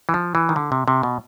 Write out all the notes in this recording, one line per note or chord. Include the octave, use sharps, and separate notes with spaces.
E3
F3
E3
D#3
D3
C3
C3
B2